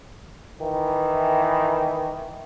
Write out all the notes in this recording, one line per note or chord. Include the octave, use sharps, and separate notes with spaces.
D#3 E3